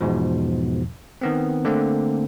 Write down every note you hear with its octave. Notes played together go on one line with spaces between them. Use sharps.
E2 G#2 B2 F3
D#3 B3 C4
D3 A3 A#3 C4